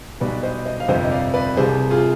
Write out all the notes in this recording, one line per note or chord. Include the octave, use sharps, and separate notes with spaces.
B1 B2 G3 B4 D5
C5 D#5
C5 D#5
F5
G1 F2 C3 G3 C5 D#5
D#5
D5 F5
B4 D5
C2 C3 G3 G#4 C5
F4 G#4